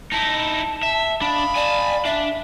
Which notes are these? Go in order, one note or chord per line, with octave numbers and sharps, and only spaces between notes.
D#4 E4 A5
E5
D4 D#5 F5 B5
D5 G#5 A5
D4 E5